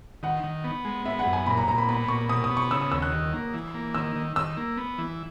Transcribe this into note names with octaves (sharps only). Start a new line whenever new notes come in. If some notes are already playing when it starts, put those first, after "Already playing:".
D#3 F#5
D#3
B3
G#3
B3 E5
F#5
F#2
G#5
A#2 B5
A#5
A#2 A#5
B5
B3 B5
A#2 C#6
B2 D#6
D#6
B3
C#6
C#3 E6
D#6
D#2 E6
F#6
D#3
A#3
E3
A#3
D#3 E6
D#3
D#3 E6
A#3
B3
E3